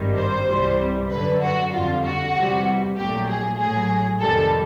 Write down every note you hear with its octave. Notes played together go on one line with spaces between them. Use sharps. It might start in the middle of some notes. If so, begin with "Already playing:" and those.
Already playing: G#1 G2 D#3 G3
C5
C2 C3 E3 G3
F#2 D3 F#3 B4
F#4
F2 D3 G3 F4
F#4
E2 C3 E3 G3
A#1 A#2 F#3 A3 G4
G#4
A1 A2 F#3 G#4
F2 C3 D#3 G3 A4